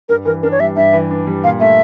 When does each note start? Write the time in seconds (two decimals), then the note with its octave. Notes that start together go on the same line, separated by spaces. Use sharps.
0.09 G2 A#4
0.25 E3 A#4
0.43 D4 A#4
0.52 C#5
0.60 G3 E5
0.76 G2 E5
0.93 E3
1.11 D4
1.27 G3
1.44 A#2 F5
1.60 A3 E5